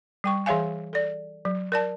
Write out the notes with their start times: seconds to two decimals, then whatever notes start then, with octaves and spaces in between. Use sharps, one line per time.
0.24 G3 G5 C#6
0.46 E3 G#4 C#5 E5 F5 G#5
0.93 A4 D5
1.45 F#3
1.72 A#4 D5 A5